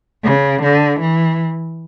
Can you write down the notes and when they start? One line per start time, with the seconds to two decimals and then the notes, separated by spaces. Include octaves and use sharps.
0.24 C#3
0.63 D3
1.01 E3